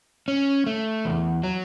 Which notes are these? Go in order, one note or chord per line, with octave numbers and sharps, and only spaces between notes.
C#4
A3
E2
F#3